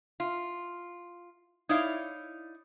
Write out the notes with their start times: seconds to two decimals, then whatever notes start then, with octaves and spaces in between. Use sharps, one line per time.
0.20 F4
1.69 D#4 E4 C#5 D5 F5